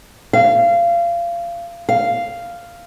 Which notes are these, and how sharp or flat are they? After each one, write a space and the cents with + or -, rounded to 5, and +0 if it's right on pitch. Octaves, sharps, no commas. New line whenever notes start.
F5 -25
F5 -5